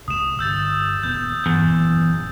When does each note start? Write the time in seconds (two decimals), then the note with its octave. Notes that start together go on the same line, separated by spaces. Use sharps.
0.08 C2 G#3 D#6 E7
0.39 G1 G3 E6 G6 A6
1.03 D#1 D2 B3 G6
1.46 E2 G2
1.62 D#1 F#2